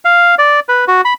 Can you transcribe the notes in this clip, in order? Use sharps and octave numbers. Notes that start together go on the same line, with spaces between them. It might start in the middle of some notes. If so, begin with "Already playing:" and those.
F5
D5
B4
F#4
B5